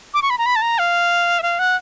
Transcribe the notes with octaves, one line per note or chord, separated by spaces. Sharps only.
D6
C#6
B5
A#5
B5
A5
A#5
F5
E5
F5
F#5